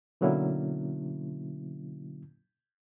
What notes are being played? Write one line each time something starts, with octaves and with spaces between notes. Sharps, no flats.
B2 D3 F#3 A#3 C#4 E4